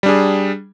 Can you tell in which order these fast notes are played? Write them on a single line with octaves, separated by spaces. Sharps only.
G3 D4 G#4